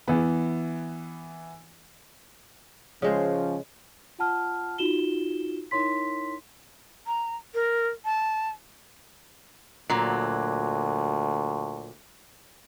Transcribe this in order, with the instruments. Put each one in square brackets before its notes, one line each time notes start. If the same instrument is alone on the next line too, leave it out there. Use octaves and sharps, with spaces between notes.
[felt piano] E3 B3
[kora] C#3 G#3 C5 [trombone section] F3 C#4
[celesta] F4 F#5 A5 F6
D#4 F4 F#4 E7 G7
D#4 E4 A#4 C#5 C6 B6
[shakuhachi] A#5
A#4
A5
[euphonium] D2 [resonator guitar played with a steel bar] A#2 F#3